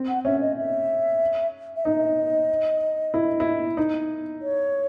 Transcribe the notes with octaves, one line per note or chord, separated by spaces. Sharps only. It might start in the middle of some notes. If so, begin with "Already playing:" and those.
Already playing: C4
F#5
C#4 E5
D#5
E5
E5
D#4 D#5
E4
E4
D#4
C#5